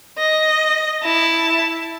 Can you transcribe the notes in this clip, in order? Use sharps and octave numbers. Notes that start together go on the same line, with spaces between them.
D#5
E4 A5